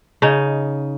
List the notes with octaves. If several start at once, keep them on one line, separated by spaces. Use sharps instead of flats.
C#3 D#4